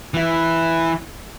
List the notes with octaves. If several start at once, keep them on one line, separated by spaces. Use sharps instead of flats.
E3 E4